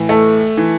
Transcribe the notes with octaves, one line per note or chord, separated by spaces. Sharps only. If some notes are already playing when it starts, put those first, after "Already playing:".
Already playing: A2 E3
A3
E3